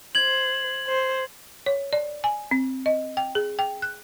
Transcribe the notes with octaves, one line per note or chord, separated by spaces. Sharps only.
C5 G#6 F#7
C5
C#5
D5
G#5
C4
D#5
G5
G#4
G5
F#6